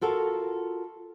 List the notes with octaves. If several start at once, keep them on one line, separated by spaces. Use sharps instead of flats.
F4 F#4 A4 A#4 F5